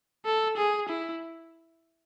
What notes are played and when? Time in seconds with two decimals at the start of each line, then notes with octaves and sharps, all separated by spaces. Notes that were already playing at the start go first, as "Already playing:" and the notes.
0.25 A4
0.57 G#4
0.89 E4